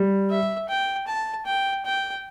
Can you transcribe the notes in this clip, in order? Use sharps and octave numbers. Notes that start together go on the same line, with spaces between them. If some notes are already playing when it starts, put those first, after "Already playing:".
Already playing: G3
E5
G5
A5
G5
G5